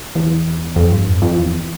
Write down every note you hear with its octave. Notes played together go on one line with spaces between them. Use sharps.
E2
F2
G2
F2
F2
E2